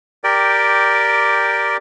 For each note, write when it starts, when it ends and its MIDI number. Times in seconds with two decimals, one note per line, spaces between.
0.24 1.77 67
0.24 1.77 70
0.24 1.77 74
0.24 1.77 79